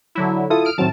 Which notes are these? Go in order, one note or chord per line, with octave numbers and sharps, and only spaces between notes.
D3 F#3 E4
E4 F4 A4 D#6
F6 D7
A2 D#3 F#3 C4 A5